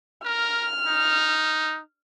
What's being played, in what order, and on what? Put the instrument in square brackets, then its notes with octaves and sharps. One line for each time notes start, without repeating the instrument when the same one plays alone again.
[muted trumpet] A#4 [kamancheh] F6
[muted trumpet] D#4